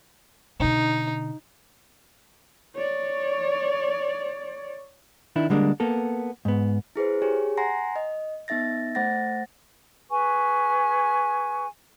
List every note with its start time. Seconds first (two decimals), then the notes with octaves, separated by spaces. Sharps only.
0.60 B2 D3 D#4
2.76 C#5 D5
5.36 D#3 D4 E4
5.50 D3 G3 G#3 A#3 C4 D4
5.80 A#3 B3 A4
6.45 G#2 B3
6.96 E4 G#4 B4 C5
7.22 G4 G#4 C#5 G#5
7.57 F#5 G#5 A#5 C6 A#6 C7
7.96 D#5
8.48 B3 D#4 E5 A6 A#6
8.95 A3 C5 F#5 A6 A#6
10.10 G#4 B4 G#5 C#6